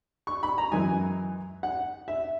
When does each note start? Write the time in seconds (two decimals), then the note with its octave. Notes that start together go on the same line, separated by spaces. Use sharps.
0.27 C#6
0.43 B5
0.58 A#5
0.72 F#2 E3 G#3 G#5
1.63 F#5
2.08 E5